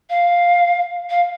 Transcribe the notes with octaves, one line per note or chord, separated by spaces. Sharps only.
F5
F5